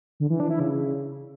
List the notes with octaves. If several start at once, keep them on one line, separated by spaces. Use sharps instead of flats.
D3
E3
D4
E4
C#3